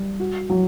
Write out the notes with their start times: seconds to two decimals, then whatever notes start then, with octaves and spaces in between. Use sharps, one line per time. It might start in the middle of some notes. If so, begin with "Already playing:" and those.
Already playing: G3
0.20 F#4
0.50 F#3